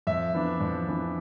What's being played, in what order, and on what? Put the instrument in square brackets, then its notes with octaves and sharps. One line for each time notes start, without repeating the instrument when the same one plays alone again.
[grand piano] F2 E5
E3 B3 D4
F2
E3 B3 D4